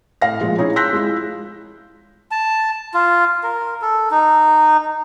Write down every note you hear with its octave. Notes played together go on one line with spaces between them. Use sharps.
A2 F5 A#6
A#2 F3 G#3 F4
C#4 D#4 E4 G#4
C6 E6 F#6 G6 A#6 B6
G#3 E4 F4
A5
F4
A#4
A4
D#4